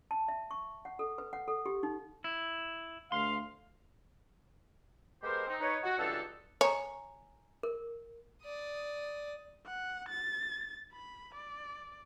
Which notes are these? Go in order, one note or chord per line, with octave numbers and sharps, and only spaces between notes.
A5
E5
C#6
F#5
A4
B4
F#5
A4
G4
D#4
E4
D2 F5 C6
G#3 B3 G4 A#4 C5
C4 D#4
D#4 B4 C#5
F#4
C#2 G2 E3 D4 D#4 A4
C#5 G#5 A#5
A#4
D5 D#6
F#5
A6
B5
D5